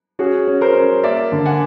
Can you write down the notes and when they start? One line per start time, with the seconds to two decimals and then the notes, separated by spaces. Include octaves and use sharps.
0.19 C#4 F#4 G#4
0.47 C#4
0.61 A#4 C5
0.75 C#4
1.03 A#3 D5 E5
1.32 D3
1.45 F#5 G#5